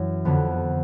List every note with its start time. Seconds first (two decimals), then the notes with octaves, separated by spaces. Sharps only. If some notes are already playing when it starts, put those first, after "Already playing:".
Already playing: F#2 E3
0.25 F2 D3 B3